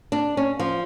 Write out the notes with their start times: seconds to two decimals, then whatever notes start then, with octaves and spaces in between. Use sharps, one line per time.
0.12 D4
0.37 C#4
0.59 F3